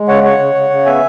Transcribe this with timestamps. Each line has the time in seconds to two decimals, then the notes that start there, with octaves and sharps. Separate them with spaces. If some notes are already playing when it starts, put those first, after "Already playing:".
Already playing: G#3
0.08 C#3 C#5 F#5
0.24 C#3 C#5 F#5
0.39 C#3
0.55 C#3
0.70 C#3
0.86 B3 E5 G#5